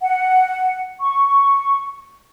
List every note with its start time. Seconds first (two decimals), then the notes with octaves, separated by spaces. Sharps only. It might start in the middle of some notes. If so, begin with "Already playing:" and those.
0.01 F#5
1.01 C#6